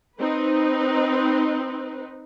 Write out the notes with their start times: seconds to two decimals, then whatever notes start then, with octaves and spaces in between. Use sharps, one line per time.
0.19 C4 D#4 B4